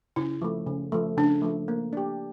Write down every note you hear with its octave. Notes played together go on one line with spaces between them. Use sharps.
C#3 E4
F3 A3
C#3
F3 A3
C#3 D4
F3 A3
A#3
D4 G4